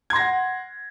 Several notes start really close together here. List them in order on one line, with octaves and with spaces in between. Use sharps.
G#6 C6 A#6 F#5